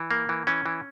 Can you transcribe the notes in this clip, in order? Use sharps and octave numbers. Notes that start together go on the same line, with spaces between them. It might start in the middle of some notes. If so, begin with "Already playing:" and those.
Already playing: E3
A#3
E3
E3 C#4
E3